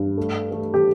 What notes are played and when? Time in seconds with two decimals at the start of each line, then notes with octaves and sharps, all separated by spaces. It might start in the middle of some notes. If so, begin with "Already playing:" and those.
Already playing: G2
0.17 A3
0.52 A3
0.74 G4